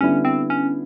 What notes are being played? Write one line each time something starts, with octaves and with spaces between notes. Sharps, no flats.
D3 G3 B3 C#4 E4
C4
C#4